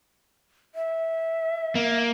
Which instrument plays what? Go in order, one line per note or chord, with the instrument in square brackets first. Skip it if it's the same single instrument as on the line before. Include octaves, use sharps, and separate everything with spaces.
[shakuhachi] E5
[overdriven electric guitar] A#3